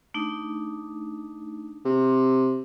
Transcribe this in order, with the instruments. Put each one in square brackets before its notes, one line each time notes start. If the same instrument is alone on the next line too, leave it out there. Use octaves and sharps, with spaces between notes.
[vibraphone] A3 D4 D#4
[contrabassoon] C3